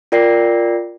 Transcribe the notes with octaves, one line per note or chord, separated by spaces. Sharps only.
F4 A#4 D5 G5 A#6 C7